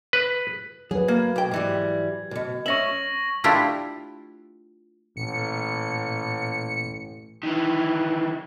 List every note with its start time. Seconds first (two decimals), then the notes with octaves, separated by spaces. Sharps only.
0.13 B4
0.91 F#3 G#4 B4
1.08 A#3 G#6
1.36 B1 G5
1.51 G#2 E3 G3
2.31 B1 B2
2.66 C#4 E5 C#6 A#6 F#7
3.44 A3 D4 E4 F4 G4
5.17 A1 A#2 C#7
7.43 D#3 E3